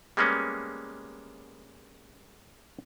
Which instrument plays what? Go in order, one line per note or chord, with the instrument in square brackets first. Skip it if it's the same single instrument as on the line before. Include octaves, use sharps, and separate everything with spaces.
[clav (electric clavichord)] G3 G#3 A#3 B3 C#4